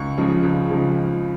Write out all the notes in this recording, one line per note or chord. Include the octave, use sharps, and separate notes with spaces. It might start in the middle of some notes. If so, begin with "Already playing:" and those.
Already playing: C#2 C#6
C#3 F3 G#3
C#2
C#3 F3 G#3